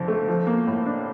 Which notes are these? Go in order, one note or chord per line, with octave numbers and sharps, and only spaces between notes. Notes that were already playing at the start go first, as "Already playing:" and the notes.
Already playing: F2 D3 F3
A3
F3
A#3
A2
D4